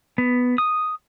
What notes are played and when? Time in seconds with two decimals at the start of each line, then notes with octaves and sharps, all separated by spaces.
0.18 B3
0.58 D#6